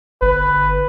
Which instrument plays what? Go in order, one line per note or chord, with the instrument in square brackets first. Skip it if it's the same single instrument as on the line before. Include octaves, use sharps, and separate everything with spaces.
[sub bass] G1 [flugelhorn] B4